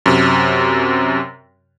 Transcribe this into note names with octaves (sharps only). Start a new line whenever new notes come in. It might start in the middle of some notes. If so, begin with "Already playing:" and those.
F#2 C3